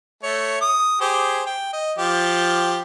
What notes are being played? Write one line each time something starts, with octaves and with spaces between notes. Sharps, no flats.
A3 C#5
D#6
G4 G#4 C5
G5
D#5
F3 G4